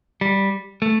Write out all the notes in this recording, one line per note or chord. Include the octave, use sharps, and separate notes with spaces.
G3
A3